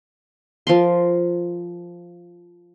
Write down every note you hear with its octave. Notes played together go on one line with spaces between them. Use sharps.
F3 A#4 C6